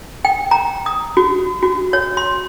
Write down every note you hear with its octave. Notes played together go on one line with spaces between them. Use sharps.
G5
A#5
D#6
F#4
F#4
C#5
C6